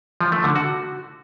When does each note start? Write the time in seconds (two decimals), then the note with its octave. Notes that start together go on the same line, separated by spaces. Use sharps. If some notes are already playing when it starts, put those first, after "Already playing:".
0.21 F3
0.32 A3
0.44 D3
0.56 F#4